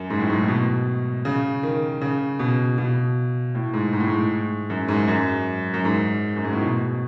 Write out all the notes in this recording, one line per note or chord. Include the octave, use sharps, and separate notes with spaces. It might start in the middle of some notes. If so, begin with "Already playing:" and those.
Already playing: F#2
G#2
A2
G#2
A2
B2
C#3
D#3
C#3
B2
B2
A2
G#2
G#2
A2
G#2
F#2
G#2
F#2
F#2
G#2
F#2
G#2
A2
B2